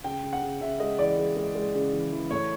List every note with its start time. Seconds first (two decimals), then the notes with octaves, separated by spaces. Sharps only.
0.04 C#3 G5
0.24 C#3
0.33 F#5
0.42 C#3
0.61 C#3 E5
0.80 G#3 D#5
0.98 E3 D5
1.18 G#3
1.37 G#3
1.56 G#3
1.74 C#3
1.93 E3
2.13 E3
2.31 A2 C#5